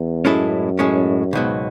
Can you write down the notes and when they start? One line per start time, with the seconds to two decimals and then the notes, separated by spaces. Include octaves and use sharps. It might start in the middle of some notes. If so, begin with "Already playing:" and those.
Already playing: E2
0.25 F#2 A2 G#3 C#4 E4 A4
0.79 A2 G#3 C#4
1.33 C#2 G#2 B2 F#3